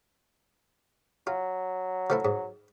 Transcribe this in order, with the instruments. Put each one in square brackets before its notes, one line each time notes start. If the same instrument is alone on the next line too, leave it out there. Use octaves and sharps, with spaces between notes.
[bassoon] F#3 [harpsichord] F4
[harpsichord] F3 A3 E4
G#2